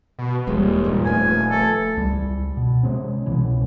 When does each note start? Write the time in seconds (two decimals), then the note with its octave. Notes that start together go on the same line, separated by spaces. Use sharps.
0.19 B2
0.47 D#1 D#2 E3 G3 G#3
0.85 G2 A#2
1.05 F3 A3 B3 G#5
1.51 A4
1.97 C#2 G3
2.57 B2
2.83 C3 G#3 C4 C#4
3.26 C2 B2 E3 C#4